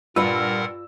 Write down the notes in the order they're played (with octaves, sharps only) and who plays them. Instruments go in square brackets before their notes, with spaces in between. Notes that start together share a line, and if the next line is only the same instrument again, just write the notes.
[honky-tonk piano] G2 E6 [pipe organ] A#2 A#4 F#5 [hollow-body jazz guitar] F4 B4